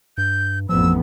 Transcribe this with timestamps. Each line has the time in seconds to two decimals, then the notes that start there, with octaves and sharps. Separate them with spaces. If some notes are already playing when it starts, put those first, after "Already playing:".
0.18 G2 G6
0.69 A1 F2 F3 B3 E6